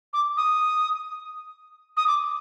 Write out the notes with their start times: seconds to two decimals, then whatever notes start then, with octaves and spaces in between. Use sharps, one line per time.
0.13 D6
0.37 D#6
1.97 D#6
2.07 D6